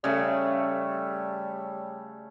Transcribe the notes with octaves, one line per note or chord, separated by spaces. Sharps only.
C#3 G3 A3